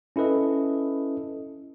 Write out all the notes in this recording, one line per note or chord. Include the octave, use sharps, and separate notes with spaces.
C#4 E4 A4 B4 D#5